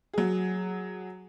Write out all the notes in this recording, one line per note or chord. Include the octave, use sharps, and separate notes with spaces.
F#3 G#4